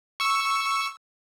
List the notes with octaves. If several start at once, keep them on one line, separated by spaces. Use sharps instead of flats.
C#6 E6